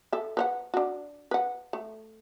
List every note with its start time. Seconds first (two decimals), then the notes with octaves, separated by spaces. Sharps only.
0.12 A4 E5
0.37 B4 C5 F#5
0.74 D4 F#4
1.31 B4 F#5
1.73 A3